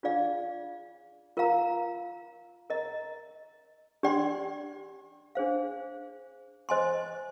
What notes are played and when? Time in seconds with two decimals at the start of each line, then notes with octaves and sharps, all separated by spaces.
0.03 D4 F4 G#4 D5 F5
1.37 F4 A#4 F5 A#5
2.70 A#4 D#5 A#5
4.03 D4 G4 D5 G5 C6
5.35 D4 G#4 C5 F5
6.69 C5 D#5 G#5 C6